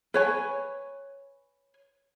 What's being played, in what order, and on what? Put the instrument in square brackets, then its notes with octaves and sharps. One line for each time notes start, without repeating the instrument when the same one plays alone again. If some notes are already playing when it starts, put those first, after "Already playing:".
[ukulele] B4 C#5 G#5